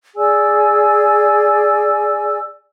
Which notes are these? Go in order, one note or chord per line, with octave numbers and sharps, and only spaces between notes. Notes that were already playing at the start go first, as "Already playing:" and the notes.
G#4 D5 G#5 E6